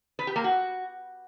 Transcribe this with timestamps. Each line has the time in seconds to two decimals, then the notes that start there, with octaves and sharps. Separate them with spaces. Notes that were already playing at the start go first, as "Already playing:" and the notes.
0.19 B4
0.27 G4
0.36 A#3
0.44 F#4